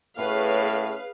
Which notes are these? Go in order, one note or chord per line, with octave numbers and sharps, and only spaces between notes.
A2 C#4 F#4 G#4 B4 C#5 F5